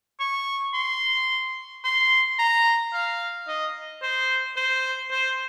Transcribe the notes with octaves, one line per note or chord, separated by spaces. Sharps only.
C#6
C6
C6
A#5
F5
D#5
C5
C5
C5